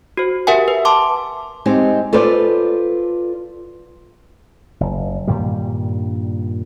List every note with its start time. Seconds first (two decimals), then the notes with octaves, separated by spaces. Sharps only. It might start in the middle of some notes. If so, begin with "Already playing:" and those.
0.17 F#4 C5
0.47 G4 A#4 E5 F#5 G#5
0.68 B4
0.85 A5 C6 D6
1.65 G#3 C4 D#4 G4
2.13 F4 A4 B4 C5 D5
4.80 F#1
5.27 G2 A#2 D#3 G3